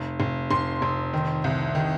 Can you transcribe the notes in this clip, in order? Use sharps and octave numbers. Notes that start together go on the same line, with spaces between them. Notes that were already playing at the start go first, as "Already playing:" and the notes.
Already playing: F1
F1
F1 C6
F1
D#3
C2
D#3